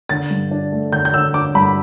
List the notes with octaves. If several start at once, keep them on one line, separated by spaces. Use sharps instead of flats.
D3 A6
G2
D4
A3
D3 G6
G6
D3 E6
D4 D6
G2 B5